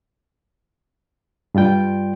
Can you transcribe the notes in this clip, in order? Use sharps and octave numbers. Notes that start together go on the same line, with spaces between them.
G2 G3 F4 G5